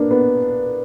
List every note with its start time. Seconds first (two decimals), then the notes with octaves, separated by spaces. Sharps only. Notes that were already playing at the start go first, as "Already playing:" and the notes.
Already playing: A#3 B3 D4
0.11 B3